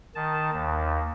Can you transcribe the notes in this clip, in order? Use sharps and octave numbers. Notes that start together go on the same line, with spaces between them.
D#3 A5
D#2